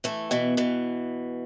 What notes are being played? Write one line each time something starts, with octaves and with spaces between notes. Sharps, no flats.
E3 A3
B2 E3
B2 E3